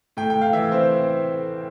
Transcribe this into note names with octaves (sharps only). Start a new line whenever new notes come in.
A2 G5
G5
A2
F5
E3 E5
C4 C5